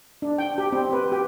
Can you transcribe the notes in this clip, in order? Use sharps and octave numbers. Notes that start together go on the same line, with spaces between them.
D4
G5
G4
C4
B4
G4